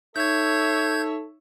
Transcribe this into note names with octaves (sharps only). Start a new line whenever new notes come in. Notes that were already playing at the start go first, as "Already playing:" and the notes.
D#4 A4 C#5 E5 G6 G#6